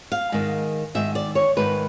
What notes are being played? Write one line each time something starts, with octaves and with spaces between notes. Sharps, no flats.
F5
G#2 D#3
G#2 D#3 E5
D5
C#5
G#2 D#3 B4